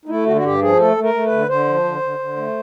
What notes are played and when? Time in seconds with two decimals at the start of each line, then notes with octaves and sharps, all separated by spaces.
0.05 D#4
0.08 A3 E4
0.26 D3 F#4
0.36 F#4
0.44 G2 G4
0.61 F3 G#4
0.79 A3 A4
0.97 A3
1.03 A#4
1.14 A3
1.26 B4
1.31 D3
1.49 D3 C5
1.66 F3
1.84 D3
2.02 D3
2.19 D3
2.36 A3